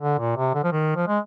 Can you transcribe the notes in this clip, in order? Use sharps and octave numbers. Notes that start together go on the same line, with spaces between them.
D3
A#2
C3
D3
F3
D#3
F3
G#3